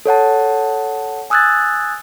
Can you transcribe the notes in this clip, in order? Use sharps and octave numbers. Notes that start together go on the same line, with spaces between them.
A4 C#5 F#5 A5
G#5 D#6 E6 F#6 G#6 A6